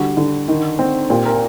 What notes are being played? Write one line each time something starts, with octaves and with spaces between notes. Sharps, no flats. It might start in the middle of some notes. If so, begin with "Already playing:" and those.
Already playing: D3 G3 F#4
D3
D#3
C4
A#2 G4
A#4